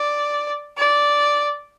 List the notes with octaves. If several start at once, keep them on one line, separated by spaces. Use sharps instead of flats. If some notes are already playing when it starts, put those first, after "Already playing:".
Already playing: D5
D5